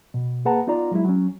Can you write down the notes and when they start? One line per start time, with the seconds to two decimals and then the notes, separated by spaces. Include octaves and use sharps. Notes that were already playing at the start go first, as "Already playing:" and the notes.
0.14 B2
0.45 A#3 G#4 B4 F#5 A5 A#5
0.67 B3 D#4 F4 D5 A#5
0.92 F#3 G#3 E4
1.05 F#3 C#4